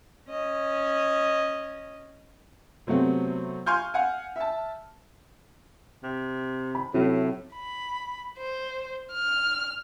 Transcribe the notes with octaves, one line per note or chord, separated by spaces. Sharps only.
C#4 D#5
C3 F#3 A3 B3 C4
F5 G#5 C6 C#6 F6 G6
F5 F#5 G#5
E5 A5
C3
B5
A2 C3 F#3 E4
B5
C5
F6